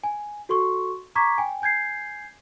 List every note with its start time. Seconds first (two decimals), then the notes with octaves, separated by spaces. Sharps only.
0.04 G#5
0.49 F#4 A4 C6 C#6
1.15 A#5 C#6 D6 G#6 B6
1.38 G5 G#5
1.62 G#5 G6 G#6 C7